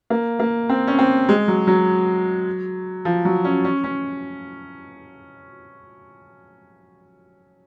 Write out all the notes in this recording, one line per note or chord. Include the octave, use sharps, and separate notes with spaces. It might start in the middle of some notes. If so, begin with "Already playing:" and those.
A#3
A#3
C4
C#4
C4
G#3
F#3
F#3
F3
F#3
C#4
C#4
C#4